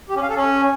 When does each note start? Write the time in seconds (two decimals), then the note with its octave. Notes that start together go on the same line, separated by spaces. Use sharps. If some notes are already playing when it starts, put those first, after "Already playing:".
0.09 G4
0.16 C#4
0.22 F5
0.29 A4
0.36 C#4